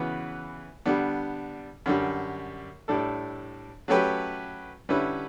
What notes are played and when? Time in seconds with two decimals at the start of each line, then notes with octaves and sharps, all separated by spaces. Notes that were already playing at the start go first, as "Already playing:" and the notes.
Already playing: C#3 E3 B3 F#4 B4
0.86 D3 G3 B3 D4
1.86 F#2 D3 G3
2.88 A2 G3 D4 A4
3.88 F#3 A3 C#4 G4 B4
4.89 D3 G3 C#4 E4 B4